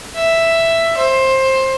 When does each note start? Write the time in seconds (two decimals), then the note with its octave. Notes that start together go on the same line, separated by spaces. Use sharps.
0.16 E5
0.98 C5